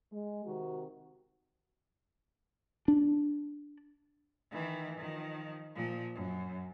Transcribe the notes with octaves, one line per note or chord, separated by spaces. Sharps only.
G#3
C3 D#3 C4 F#4
D4
D#3 E3
D#3 F3
A#2 F3
F#2